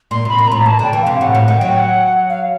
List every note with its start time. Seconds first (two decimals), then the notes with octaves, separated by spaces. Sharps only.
0.11 A#2 C6
0.25 C3 B5
0.39 A#2 B5
0.47 A2 A#5
0.65 B2 A5
0.79 D3 G5
0.93 E3
1.02 C3 F5
1.20 A2 F#5
1.35 A2 F#5
1.48 D#3
1.57 F#3 G5
1.75 F#5
2.30 F5